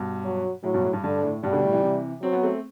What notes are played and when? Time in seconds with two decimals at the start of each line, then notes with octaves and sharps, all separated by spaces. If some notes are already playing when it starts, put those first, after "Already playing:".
Already playing: G2 B2
0.24 F#3
0.63 A2 F#3
0.73 G2 B2
0.84 A2
0.93 G2
1.04 G2 D3
1.23 A2
1.43 G2 B2 G3
1.53 B2 D3
1.63 A2
1.73 C3 E3
1.83 C3 E3
2.22 F#3 C4
2.33 B3
2.43 A3 C4